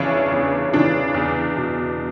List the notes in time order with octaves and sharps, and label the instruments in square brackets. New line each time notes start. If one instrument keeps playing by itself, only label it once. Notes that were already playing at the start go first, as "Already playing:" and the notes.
Already playing: [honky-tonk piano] E2 C#3 E3 C#4 D4 E4
E2
C#3 E3 D4
E2
B2